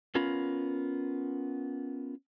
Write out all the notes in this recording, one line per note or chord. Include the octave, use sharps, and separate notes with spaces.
B3 C#4 F4 A#4 B5